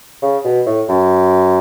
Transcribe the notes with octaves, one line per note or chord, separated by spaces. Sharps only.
C#3
B2
A2
F#2